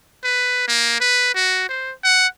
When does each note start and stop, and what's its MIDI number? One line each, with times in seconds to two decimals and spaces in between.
0.24 0.63 71
0.68 0.99 58
1.00 1.33 71
1.35 1.67 66
1.69 1.92 72
2.04 2.27 78